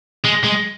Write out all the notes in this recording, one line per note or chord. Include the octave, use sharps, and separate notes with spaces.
G#3
G#3